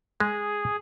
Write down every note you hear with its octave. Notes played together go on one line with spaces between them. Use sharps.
G#3 G#4